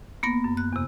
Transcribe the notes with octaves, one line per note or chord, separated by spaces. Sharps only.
A#3 B3 A#6
F#2
F#6
E2 C3